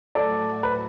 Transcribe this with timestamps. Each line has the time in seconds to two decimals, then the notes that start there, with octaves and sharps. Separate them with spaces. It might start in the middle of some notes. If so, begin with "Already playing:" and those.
0.15 A2 F#3 A3 F#4 A4 D5
0.63 B4